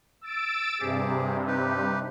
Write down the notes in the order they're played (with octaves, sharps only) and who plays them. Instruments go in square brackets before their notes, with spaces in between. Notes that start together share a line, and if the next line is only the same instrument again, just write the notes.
[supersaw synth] E6 A6 D7
[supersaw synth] G2 C3 [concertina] G4 G#4
[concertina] D#4 G4 B4